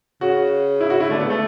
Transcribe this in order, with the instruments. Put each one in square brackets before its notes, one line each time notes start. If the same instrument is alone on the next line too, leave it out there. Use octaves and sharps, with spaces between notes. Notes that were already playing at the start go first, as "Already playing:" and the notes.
[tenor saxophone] C#3 [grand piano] F#4
[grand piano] E4
F#4
[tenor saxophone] C#3 [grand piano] E4
[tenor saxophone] D3 [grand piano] A3
[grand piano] B3
[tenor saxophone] C#3
[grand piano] A3